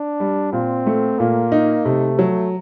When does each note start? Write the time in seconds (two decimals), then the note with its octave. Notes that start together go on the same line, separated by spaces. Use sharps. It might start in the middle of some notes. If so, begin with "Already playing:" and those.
Already playing: D4
0.20 G3
0.52 A#2 C4
0.86 A3
1.19 A#2 A#3
1.52 D#4
1.85 C3 A3
2.19 F#3